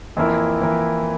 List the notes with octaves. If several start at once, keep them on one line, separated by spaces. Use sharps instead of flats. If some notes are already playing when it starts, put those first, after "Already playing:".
F2 E3 A#3 E4 A#4
F2 E3 A#3 E4 A#4